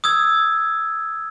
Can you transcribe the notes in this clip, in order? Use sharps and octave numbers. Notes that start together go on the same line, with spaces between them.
D#6 E6 G#6